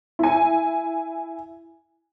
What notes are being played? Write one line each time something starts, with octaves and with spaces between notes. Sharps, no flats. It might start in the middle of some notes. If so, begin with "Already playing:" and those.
E4 G#5